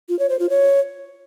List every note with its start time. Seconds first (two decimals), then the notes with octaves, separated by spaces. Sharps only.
0.09 F4
0.19 C#5
0.29 C5
0.39 F4
0.50 C#5